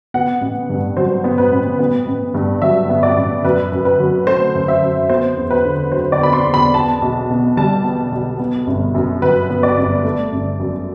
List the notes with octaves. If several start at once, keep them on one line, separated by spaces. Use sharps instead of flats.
B3 F#5
A1
G2
F#3 C5
B3
B4
A1
B3
A1
G2
F#3 E5
B3
D5
A1
F#2 B4
F#2
B4
F#3
A3 C5
F#2
E5
F#2
B3 C5
E2
B4
D3
F#3 C5
D5
B3 B5
C6
E2
B5
B3 A5
B1
B2
G3 A5
B3
B1
B3
G1
F#2
F#3 B4
B3
D5
G1
A3
G1
F#2